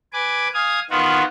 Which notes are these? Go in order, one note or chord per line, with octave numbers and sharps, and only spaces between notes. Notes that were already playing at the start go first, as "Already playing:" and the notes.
B4 G#5 D6
F5 G#5 D#6
D#3 B3 F4 F#4